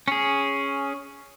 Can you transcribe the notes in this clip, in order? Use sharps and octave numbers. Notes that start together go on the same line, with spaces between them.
C#4 G#4